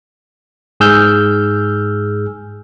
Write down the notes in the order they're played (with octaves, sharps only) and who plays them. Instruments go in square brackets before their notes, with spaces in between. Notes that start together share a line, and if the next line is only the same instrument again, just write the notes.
[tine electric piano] G#2 G#4 E6 F6 G6